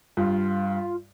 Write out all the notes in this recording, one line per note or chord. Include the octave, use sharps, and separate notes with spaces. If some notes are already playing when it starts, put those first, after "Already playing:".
G2 F4